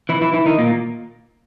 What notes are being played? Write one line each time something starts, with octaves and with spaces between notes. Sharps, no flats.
E3 E4
E3 E4
E3 E4
D#3 D#4
A#2 A#3